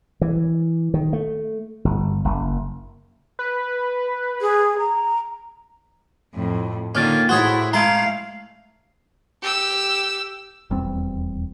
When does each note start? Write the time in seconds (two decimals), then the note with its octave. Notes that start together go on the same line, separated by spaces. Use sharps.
0.21 E3
0.94 D#3
1.13 A3
1.85 G1
2.25 F#1
3.39 B4
4.41 G#4
4.78 A#5
6.35 F2 A2
6.95 D3 D#3 A#3 C#4 F4
7.29 A2 E4 F#4 G#4 C5 C#5
7.73 A2 G#3 E4 F5 A5 A#5 C6
9.42 G4 E6
10.70 D#1 E2 G3 C4